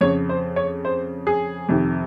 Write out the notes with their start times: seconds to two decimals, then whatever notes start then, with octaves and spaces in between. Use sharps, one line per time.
0.01 F2 C#3 C#5
0.29 C5
0.56 C#5
0.85 C5
1.27 G#4
1.69 F2 C3 D#3